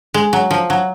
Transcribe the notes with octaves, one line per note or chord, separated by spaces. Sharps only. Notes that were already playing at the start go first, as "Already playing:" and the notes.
G#3
F#3
F3
F#3